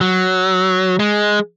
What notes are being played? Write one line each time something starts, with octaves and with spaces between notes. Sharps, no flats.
F#3
G#3